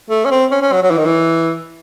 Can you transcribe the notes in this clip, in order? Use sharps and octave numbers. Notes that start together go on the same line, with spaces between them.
A3
C#4
C4
C#4
C#4
F#3
F#3
E3
D#3
E3